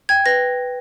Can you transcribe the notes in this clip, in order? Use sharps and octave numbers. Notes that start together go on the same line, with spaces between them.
G5 G#6
B4 A#6